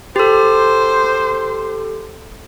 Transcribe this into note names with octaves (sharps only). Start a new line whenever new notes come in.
G4 A4 C5